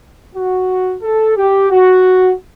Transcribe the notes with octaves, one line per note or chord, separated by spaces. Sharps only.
F#4
A4
G4
F#4